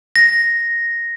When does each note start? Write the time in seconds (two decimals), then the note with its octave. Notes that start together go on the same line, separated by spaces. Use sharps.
0.16 A#6